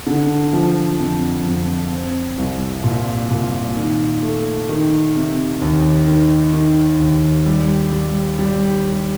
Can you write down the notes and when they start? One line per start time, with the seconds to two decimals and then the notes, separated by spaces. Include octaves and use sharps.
0.07 D3
0.53 F3
0.99 F2
1.45 F2
1.91 C4
2.38 C2
2.84 A#2
3.31 A#2
3.76 D#3
4.23 A3
4.69 D#3
5.15 C3
5.62 D#2
6.07 D#3
6.53 D#3
7.00 D#2
7.46 G3
7.92 G3
8.39 G3
8.85 G3